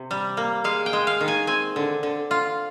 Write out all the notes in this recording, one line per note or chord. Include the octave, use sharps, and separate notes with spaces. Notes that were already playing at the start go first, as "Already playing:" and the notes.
Already playing: C3
G3
A#3
G#3 F5
G5
G#3
F5
D#3
G#5
C4 G#5
D3
D3
F4